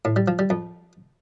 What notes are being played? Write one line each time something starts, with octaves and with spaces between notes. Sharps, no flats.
A2
G3
F3
G3
F2